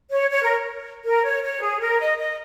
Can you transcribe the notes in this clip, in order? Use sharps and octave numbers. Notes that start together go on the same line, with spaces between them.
C#5
C#5
A#4
A#4
C#5
C#5
G#4
A#4
D#5
D#5